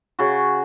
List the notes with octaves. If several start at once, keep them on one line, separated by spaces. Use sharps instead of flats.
C#3 F#4